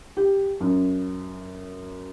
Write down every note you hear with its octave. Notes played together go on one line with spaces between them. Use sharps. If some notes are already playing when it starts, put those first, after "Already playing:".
G4
F#2